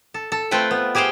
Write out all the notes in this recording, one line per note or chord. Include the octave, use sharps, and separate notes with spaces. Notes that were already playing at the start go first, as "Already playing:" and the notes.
A4
A4
A3 C4 F4 B4 G5
B3
G4 G#4 C5 F5 G5